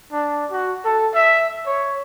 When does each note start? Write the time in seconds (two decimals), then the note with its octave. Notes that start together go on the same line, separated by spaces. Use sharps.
0.12 D4
0.51 F#4
0.85 A4
1.14 E5
1.67 C#5